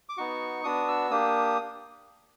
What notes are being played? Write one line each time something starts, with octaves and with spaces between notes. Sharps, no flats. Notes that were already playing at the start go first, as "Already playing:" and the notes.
D6
B3 D#4 F#4 C#6
B3 D4 F#4 D#6
E6
A#3 D4 G4 D#6